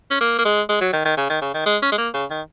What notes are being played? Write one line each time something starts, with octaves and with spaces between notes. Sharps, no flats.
C#4
A#3
A#3
G#3
G#3
F#3
D#3
D#3
C#3
D#3
C#3
D#3
G#3
C#4
G#3
A#3
C#3
D#3